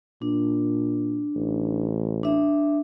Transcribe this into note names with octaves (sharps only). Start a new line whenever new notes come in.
A#2 D4
A1
D4 E5